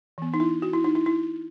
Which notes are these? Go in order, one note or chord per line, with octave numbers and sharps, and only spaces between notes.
E3 B3
D#4
E4
F#4
E4
D#4
E4
E4